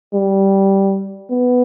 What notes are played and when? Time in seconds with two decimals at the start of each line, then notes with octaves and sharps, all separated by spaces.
0.14 G3
1.31 B3